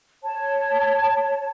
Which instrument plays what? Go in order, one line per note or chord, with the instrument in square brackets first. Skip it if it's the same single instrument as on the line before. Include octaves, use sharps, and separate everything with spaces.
[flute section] C#5 A5